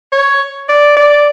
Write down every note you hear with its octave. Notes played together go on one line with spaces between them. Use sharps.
C#5
D5
D5